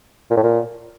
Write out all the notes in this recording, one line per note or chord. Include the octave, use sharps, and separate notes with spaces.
A#2
A2
A#2